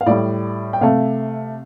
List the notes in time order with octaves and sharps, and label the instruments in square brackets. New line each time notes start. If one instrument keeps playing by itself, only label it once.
[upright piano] F5
A2 G3 D5
G5
C3 A3 F5